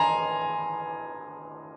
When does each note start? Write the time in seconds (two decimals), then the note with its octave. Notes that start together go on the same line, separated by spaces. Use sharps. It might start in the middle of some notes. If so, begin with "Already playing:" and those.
Already playing: G#5 A#5 C6